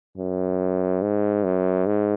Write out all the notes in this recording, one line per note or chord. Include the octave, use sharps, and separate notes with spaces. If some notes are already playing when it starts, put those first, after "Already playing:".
F#2
G#2
F#2
G#2